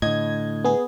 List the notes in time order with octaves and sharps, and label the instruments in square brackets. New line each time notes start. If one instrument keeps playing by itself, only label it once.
[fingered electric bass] A2 D3 [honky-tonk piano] D#5 [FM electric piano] G#6
[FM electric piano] B3 G#4